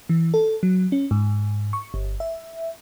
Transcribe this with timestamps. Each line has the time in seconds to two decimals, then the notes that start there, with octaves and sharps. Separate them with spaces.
0.09 E3
0.34 A4
0.63 F#3
0.92 C#4
1.11 G#2
1.73 C#6
1.94 G1
2.20 E5